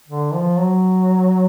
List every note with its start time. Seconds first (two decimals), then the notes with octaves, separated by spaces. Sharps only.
0.08 D3
0.34 F3
0.59 F#3